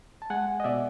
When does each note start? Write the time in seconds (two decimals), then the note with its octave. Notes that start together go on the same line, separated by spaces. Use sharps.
0.22 A5
0.30 G#3 F#5 G#5
0.60 D#5
0.64 B2 D5 E5